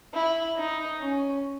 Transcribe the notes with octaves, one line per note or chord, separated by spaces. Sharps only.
E4
D#4
C#4